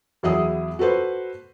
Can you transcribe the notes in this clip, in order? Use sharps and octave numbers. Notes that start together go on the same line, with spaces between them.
E2 F#3 E4 G#4 D#6
F#4 A4 B4 C5